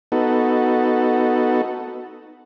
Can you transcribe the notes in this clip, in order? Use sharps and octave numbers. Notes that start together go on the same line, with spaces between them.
B3 D#4 F#4 A4